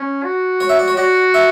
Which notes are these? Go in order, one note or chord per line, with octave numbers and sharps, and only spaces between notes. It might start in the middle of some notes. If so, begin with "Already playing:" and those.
Already playing: C#4
F#4
C#5
E5
D5
C#5
F#4 D5
E5